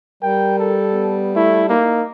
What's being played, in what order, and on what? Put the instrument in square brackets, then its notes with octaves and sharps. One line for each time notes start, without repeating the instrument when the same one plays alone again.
[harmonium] G3 [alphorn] A#4 [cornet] G5
[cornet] A4
[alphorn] B3
[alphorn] A3 [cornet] E4
[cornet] A#3 [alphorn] D#4